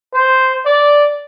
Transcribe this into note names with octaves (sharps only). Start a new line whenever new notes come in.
C5
D5